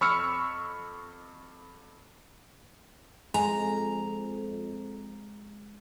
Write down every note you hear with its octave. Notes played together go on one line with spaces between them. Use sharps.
F2 B5 C#6 E6 F6 C#7
F2 G#3 G#5 A#5